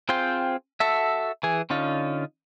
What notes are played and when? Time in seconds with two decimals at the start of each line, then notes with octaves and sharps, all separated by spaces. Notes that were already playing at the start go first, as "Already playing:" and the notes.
0.09 C4 F4 G#4 C5 G5
0.80 F#4 A4 E5
1.43 E3 G#4
1.70 D3 C#4 D#4 F4